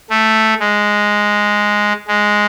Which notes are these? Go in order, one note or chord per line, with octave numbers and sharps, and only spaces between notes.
A3
G#3
G#3